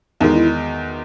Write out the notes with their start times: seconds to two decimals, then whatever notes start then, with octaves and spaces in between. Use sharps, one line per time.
0.20 E2 D#3 G#3 D#4
0.34 E4